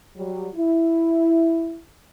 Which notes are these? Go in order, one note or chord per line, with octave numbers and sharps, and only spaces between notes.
F#3 G3
E4